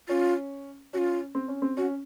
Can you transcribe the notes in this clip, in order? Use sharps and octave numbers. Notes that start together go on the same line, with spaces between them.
C#4 F4
C#4 F4 F#4
C4
C#4
C4
C#4 F#4